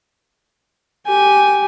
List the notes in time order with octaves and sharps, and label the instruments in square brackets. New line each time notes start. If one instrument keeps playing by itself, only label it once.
[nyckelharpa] G4 G#5